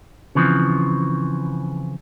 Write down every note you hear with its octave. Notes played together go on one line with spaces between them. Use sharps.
C#3 E3 F3 C4